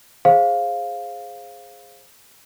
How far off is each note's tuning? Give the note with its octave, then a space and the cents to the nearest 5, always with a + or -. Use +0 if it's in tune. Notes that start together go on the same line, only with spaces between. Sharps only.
G#4 +0 C5 +20 F5 +0